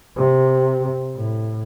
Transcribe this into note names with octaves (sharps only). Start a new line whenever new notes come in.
C3
A2